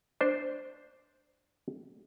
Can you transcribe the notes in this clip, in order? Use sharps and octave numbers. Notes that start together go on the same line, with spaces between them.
D4 C5